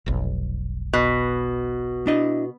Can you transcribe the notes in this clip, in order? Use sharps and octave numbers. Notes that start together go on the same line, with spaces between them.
F1 B1
B2
D4 E4 D#5